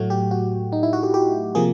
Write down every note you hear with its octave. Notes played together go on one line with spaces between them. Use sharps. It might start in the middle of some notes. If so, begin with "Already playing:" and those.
Already playing: A2 F#3 A3 F#4
G4
F#4
D#4
E4
F#4
G4
G4
C3 F3 A#3 G#4